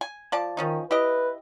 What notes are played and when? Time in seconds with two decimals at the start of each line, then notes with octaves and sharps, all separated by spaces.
0.01 G#5
0.32 F3 D5 A5
0.57 D#3 F3 C#4 D#4
0.91 E4 G4 B4 D#5